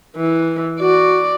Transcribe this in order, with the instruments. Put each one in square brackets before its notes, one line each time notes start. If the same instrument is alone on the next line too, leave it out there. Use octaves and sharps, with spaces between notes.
[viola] E3
[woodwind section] F#4 [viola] D5